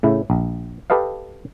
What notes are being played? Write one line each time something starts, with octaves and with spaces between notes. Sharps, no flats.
A2 C#3 E4
A#1
G4 A4 B4 D#5 F5